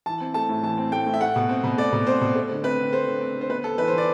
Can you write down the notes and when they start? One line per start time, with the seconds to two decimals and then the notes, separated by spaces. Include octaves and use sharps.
0.06 E3 A5
0.20 C4
0.34 A3 A5
0.49 A2
0.63 E3 A5
0.78 C4
0.92 A3 G5
1.06 A2
1.14 E5
1.21 A3 F#5
1.36 B2
1.49 C4
1.64 B2
1.78 A3 D5
1.92 B2
2.07 C4 C5
2.21 B2
2.35 A3
2.49 D3
2.64 C4 B4
2.78 D3
2.93 A3 C5
3.07 D3
3.21 C4
3.36 D3
3.41 C5
3.50 B3 B4
3.64 B3 A4
3.78 E3 B4
3.88 C5
3.93 E3
3.98 D5